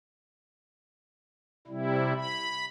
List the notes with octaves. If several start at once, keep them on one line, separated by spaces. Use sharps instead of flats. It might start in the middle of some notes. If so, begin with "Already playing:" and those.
C3 G3 E4
B5